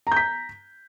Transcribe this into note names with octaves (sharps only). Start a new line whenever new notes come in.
A#5 G6 B6